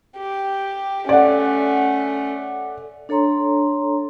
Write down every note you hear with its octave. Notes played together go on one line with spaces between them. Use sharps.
G4
A3 C#4 D5 F#5
D4 A4 C#5 A#5 C6